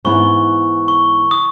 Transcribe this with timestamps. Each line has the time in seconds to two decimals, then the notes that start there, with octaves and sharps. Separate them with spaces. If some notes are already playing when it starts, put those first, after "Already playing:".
0.04 G#2 E3 B3 E4 B4 C#6
0.88 C#6
1.31 D#6